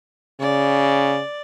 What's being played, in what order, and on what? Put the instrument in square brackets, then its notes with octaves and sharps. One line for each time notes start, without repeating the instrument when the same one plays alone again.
[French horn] C#3 [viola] D5